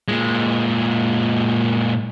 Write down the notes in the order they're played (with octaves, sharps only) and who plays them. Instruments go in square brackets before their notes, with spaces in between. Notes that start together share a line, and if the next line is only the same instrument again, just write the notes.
[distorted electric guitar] A#2 G#3